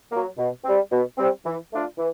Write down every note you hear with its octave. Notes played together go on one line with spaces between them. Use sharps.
F#3 A#3
B2
G3 C4
B2
G3 C4
E3
A3 D4 F4
E3